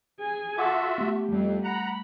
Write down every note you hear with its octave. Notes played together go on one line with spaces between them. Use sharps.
G#4 G#5
F4 F#4 A4 E5 F#5 D6
A3 B3 G4
F2 G3 A3
F#5 A#5 B5